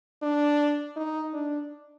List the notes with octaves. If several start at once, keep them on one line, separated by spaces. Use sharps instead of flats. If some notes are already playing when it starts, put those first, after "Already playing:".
D4
D#4
D4